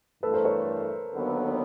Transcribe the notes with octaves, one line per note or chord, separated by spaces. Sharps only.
G2 E3 A3 A4 B4
A#4 C5
B4 C#5
D#2 D3 F#3 B3